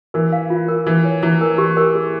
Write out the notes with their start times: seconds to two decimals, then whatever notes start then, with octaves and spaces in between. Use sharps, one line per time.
0.14 E3 A#4
0.32 F5
0.50 F4
0.68 A#4
0.86 E3 A#4
1.04 C#5
1.23 E3 E4
1.41 A#4
1.58 G4
1.77 A#4
1.95 G#4